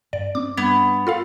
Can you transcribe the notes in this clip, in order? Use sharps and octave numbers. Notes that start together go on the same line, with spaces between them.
G2 D5
C4 C#4 D6
G2 B3 G#6
F4 A4 F5